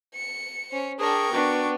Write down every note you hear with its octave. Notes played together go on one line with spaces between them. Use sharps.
C#7
C#4 C5
D4 G#4 A#4 G5 C#6
B3 D4 F#4